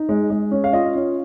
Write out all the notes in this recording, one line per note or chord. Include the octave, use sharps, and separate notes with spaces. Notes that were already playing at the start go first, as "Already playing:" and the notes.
Already playing: D#4
G#3
G#3
C#4
F5
F4 D#5
C#4